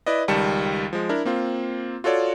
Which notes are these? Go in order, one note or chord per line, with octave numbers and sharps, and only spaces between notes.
E4 B4 D5 D#5
C#2 D#3 G3 A5 C#7 E7
F3 G#3
D4 E4 A#4
A#3 C4 F4
F4 F#4 A4 C#5 D5